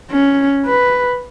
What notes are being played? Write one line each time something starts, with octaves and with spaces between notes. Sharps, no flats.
C#4
B4